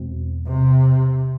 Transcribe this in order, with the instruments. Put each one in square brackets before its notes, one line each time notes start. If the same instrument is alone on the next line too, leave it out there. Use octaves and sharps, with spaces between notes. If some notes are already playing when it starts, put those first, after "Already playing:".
Already playing: [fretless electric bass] E2 B2 G#3 C4
[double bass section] C3